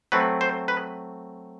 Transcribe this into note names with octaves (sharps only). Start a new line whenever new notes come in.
F#3 A3 C4 B4
C5
B4